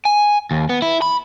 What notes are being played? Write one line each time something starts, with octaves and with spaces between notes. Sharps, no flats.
G#5
D#2
B3
E4
B5